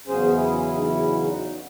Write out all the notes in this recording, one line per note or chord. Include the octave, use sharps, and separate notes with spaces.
E2 C#3 F#3 C#4 G#4 C5
E4 G#4
F#4
E4 G#4
D#4
C#4 E4
D#4 F#4
F#4